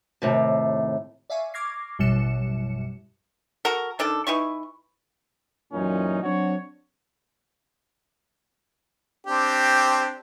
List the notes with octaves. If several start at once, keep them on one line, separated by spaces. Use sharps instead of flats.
D#2 A2 C3
D5 E5 F5 G#5 C#6
C#6 D6 F6 G#6 A#6 C7
A1 F#2 B2 G3 C#7 E7
F#4 A4 A#4
D#3 D4 A4
E3 D#4 E4 C#6
F#2 A#2 E3 C#4 D#4
F#3 C4 D4 F#4 C#5
C4 D4 G4